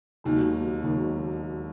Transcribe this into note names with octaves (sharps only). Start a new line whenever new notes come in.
E1 D#2 D#3 F#3
E1 D#2 D#3 F#3